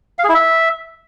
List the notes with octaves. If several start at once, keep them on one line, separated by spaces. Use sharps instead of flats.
F5
G#4
E4
E5